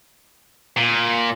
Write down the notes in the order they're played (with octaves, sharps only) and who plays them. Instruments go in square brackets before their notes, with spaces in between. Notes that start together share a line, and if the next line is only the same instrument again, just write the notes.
[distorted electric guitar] A#2